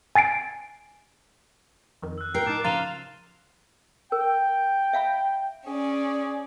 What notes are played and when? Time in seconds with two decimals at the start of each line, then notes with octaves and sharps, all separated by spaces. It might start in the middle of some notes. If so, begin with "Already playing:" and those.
0.15 G#5 A6 C7 D7
2.02 F2 D#3
2.18 E6 F#6
2.35 A#4 G5 C7
2.47 A2 D#4 A5 D6 E7
2.64 C#3 F3 F5 A#5 C6 A6 D#7
4.12 A#4 G5
4.93 E5 F5 B5
5.67 C#4 G#4 D5